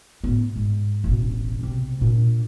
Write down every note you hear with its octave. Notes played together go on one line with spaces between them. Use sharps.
A2 B3
G#2
E1 A1
B1 C3
A#2 D4